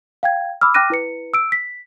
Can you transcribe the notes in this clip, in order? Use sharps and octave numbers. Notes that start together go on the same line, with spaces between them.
F5 G5 G#6
B5 D6 E6 F6
G5 D6 F6 F#6 A#6 D#7
E4 B4 C#7
E6 D7
B6